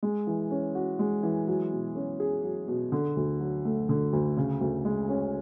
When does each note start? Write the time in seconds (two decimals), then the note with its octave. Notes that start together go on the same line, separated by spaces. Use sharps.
0.03 G#3
0.27 E3
0.51 C#4
0.75 F#4
0.99 G#3
1.23 E3
1.48 F#3
1.72 B2
1.96 C#4
2.20 G#4
2.44 F#3
2.68 B2
2.92 D3
3.16 D2
3.40 F#3
3.65 A3
3.89 D3
4.13 D2
4.37 C#3
4.61 D2
4.85 G#3
5.09 C#4